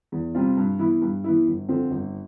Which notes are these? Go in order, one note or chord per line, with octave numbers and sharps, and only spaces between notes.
E2
C3 G3 C4 F4
G2
E3 B3 E4
G2
E3 B3 E4
G1
F2 D3 F3 C4
G1